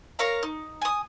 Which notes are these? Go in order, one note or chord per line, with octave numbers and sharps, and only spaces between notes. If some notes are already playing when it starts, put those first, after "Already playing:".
A#4 C#5 F5 A#5
D#4
G#5 D#6